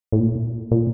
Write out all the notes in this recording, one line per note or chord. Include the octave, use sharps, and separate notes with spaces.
A2
A#2
A#2